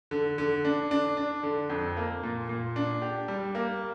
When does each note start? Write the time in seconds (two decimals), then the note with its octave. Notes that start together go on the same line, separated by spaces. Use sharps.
0.11 D3
0.38 D3
0.65 D4
0.91 D4
1.17 D4
1.43 D3
1.70 F2
1.97 A#3
2.23 A#2
2.49 A#2
2.76 D4
3.02 G4
3.28 G3
3.55 A#3